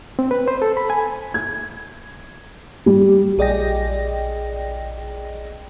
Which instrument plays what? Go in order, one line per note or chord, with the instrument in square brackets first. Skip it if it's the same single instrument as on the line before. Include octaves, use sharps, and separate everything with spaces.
[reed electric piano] C4
B4
C5
A4
B5
G#5
[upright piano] G#6
G3
[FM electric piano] A#1 G#4 D5 D#5 G5 A#6